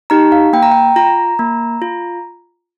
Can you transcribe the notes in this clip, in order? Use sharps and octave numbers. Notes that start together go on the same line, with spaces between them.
D#4 G4 A#5
F5
A#3 G5
A#5
G5
F4 A#5
A#3
F4